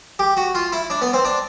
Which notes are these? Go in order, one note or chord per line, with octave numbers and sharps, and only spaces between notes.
G4
F#4
F4
E4
D4
B3
C4
D4